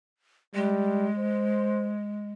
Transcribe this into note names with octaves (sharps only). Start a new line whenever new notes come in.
G3 G#3
C5